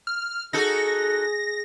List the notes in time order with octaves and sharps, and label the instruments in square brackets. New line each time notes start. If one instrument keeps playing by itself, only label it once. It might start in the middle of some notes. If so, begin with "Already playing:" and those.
[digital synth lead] F6
[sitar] D#4 F#4 A4 [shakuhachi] G#4 [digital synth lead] A#6